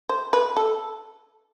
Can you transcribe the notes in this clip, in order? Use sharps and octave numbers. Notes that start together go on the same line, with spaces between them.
C5
B4
A4